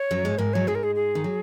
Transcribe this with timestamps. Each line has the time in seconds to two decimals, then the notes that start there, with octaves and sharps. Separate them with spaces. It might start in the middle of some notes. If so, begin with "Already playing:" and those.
Already playing: C#5
0.11 F#2 F#3
0.25 G#2 G#3
0.38 G#2 G#3 A#4
0.54 F#3 C#5
0.67 G#2 G#3 G#4
0.75 A#4
0.84 G#4
0.95 G#4
1.15 D#3
1.24 F#3